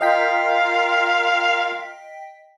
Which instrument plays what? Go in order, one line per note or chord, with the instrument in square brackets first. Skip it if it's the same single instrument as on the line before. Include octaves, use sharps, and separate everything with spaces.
[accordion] F4 A#4 [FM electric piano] D#5 G5 B6 [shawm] F5